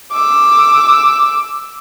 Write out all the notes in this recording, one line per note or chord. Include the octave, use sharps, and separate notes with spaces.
D6 E6